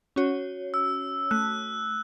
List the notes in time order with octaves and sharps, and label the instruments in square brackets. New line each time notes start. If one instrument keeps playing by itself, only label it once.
[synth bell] C#4 F#4 C#5
[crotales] E6
[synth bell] A3 [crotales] F#6